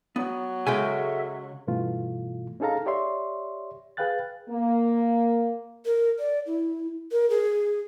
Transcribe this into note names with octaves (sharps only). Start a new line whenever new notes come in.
F#3 B3
C#3 G#3 A4 E5 G5 G#5
G2 B2 E3 A3 F4
C#4 D#4 G#4 A4 F5 A#5
G4 C#5 D5 E5 C6
G#4 B4 F5 G5 F#6 A6
A#3
A#4
D5
E4
A#4
G#4